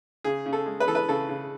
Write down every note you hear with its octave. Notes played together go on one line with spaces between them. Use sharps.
C#3 G#4
C#3
A4
G#3
B4
E3 A4
B4
C#3 A4
C#3